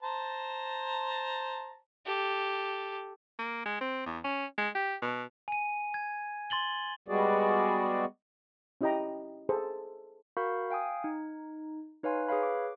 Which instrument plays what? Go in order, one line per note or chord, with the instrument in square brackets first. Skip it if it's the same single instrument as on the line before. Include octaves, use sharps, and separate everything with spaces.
[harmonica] C5 A5 A#5
[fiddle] G4 A4
[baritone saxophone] A#3
G#3
C4
E2
C#4
G#3
G4
B2
[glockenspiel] G#5 D#7
G#6
C6 A6 F#7 G7
[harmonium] G3 G#3 B3 F#4 G#4 D5
[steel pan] C#4 E4 G4 D#5 G5 A#5
G#4 A4 C5
[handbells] F#4 A#4 F5 B5 C#6 G6
F5 G5 G#5 D#6
D#4
D#4 B4 C#5 F5 G#5 C6
G#4 B4 C#5 F5 B5
D6